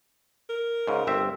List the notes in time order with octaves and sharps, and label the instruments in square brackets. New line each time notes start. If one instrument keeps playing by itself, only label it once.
[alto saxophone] A#4
[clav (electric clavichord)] G#2 C#3
G1 C4 E5